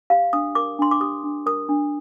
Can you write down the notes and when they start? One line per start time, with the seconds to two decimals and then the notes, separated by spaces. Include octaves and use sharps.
0.10 G4 F5
0.33 D4 D#6
0.55 A#4 D6
0.79 D4 C6
0.91 D6
1.01 G4 D#6
1.24 D4
1.46 A#4 D#6
1.69 D4